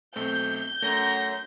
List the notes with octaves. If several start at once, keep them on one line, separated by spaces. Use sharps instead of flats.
B1 A3 C4 G6
F#2 A3 A#6